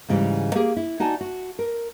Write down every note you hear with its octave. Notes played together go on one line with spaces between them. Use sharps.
G#2 C#3 E3 G3
A#3 G4 G#4
E4
D#4 F#4 D5 G#5 A5
F#4
A#4